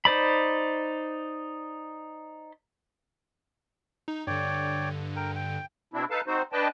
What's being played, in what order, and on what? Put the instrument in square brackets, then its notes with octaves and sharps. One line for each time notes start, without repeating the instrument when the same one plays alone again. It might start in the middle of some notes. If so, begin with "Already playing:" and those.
[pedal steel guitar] D#4 C5 D5 B5
[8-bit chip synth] D#4
[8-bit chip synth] G2 D3 [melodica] C#5 D5 G5
[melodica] A#4 G5
G5
[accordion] B2 C4 D4 E4
D#4 A4 B4 F5 A5
C4 D#4 F#4 C5
D4 B4 D5 D#5 G5 A5